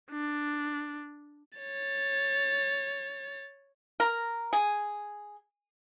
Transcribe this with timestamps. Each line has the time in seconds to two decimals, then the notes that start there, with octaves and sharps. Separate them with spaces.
0.11 D4
1.58 C#5 A6
4.00 A#4
4.53 G#4